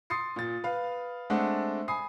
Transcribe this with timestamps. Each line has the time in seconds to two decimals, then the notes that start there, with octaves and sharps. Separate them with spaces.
0.10 C6 D#6 A6 C7 C#7
0.36 A#2 A6
0.64 B4 F5
1.30 G#3 A3 C4 D4 F#5
1.88 G#5 B5 D#6 C7